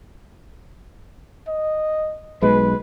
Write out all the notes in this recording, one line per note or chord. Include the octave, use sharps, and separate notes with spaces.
D#5
B1 G#3 B4